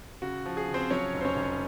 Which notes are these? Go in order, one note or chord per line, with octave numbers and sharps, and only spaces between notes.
C#3 F#4
F3
G#4
C#3
C4 C5
F#3 C#4 C#5
F1
C5
C#4 C#5
F1